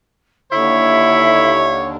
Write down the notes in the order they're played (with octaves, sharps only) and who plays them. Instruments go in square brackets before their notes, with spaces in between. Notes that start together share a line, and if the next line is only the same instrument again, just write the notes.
[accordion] D#2 D3 [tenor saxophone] E4 [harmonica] C#5 [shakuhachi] E5